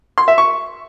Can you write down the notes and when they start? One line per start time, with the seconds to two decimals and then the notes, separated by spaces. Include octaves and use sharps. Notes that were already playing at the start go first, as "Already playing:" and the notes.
0.18 C6
0.28 E5
0.38 C#6